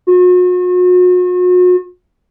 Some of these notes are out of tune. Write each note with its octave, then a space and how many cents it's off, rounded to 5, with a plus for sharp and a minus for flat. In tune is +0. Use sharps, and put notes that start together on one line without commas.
F#4 -40